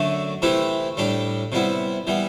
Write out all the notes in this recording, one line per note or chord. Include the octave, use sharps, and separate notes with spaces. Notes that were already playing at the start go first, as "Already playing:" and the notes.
Already playing: F#2 D3 A3
C3 E3 A3 E4 G4
A2 G3 D4 G4
C3 G3 B3 E4
E3 G3 B3